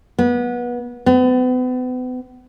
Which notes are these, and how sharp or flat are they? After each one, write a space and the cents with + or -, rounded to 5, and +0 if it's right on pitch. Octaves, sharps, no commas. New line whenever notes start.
B3 -25
B3 +40